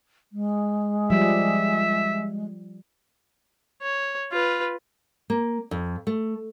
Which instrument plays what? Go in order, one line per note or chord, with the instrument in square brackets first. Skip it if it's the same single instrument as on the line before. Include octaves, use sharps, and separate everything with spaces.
[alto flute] G#3
[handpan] F3 G3 [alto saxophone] E5
[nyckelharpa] C#5
F4 B4
[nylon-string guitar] A#3
F2
A3